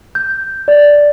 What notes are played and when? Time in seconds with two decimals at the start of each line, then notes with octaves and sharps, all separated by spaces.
0.15 G6
0.68 D5